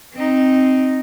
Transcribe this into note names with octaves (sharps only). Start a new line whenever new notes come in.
C4 D#4